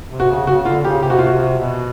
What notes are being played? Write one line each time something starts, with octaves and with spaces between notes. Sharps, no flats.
C3
F#4
C#3
C#3 F#4
D3 F4
C#3 G4
C3 G4
F#4
F4
C3 F#4
B2